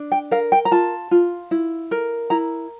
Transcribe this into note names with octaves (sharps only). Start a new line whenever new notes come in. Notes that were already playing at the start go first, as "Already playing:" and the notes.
Already playing: D4
G5
A#4 F5
G5
A#5
F4 A5
F4
E4
A#4
E4 A#5